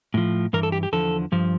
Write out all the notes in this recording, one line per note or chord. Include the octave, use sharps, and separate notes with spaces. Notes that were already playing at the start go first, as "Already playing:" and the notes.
A2 F3
G2 E3 A#4
A4
G4
G4
E2 D3 F3 A4
G2 F3